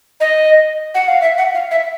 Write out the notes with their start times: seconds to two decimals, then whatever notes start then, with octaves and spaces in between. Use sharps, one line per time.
0.20 D#5
0.95 F#5
1.08 F5
1.21 E5
1.38 F#5
1.55 F5
1.71 E5